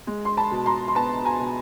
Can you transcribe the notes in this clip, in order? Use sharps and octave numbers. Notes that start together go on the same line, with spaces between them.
G#3
C6
A5 B5
B2
A#5 C6
C6
B3 A5 B5
G#5 A#5
B2